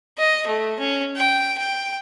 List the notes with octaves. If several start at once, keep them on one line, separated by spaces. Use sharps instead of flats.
D#5
A3
C#4
G5
G5